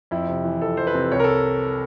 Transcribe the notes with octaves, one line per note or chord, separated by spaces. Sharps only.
F2 E4
C3
E3
F2 A4
F2 C5
B4
C3
C2 C#5
A#4
A4